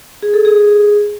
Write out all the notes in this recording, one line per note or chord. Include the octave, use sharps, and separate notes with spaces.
G#4
A4
G#4